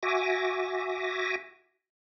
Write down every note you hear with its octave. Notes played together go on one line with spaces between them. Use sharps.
F#4 E5 G#5 D6 A#6